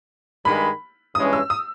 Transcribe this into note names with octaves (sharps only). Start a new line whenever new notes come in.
G2 D#3 G#3 B5
G2 E3 G#3 C#4 D#6
E6
D#6